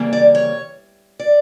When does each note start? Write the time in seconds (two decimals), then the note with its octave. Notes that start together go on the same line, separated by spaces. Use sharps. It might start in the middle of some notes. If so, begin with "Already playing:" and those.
Already playing: F2 C#3 E3 G3 A#3
0.13 D5
0.35 C#5
1.19 D5